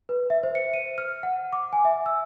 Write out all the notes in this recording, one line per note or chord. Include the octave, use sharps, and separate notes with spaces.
B4
E5
C5
C#7
D#7
F6
F#5
D6
G#5
E5
E6